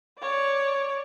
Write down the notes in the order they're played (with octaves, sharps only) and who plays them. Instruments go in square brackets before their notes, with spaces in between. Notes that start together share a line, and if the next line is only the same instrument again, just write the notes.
[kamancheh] C#5 D5